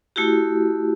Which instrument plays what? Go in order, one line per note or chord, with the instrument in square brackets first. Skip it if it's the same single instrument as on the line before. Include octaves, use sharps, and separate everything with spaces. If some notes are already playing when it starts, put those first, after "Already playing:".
[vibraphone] A3 E4 F#4 G4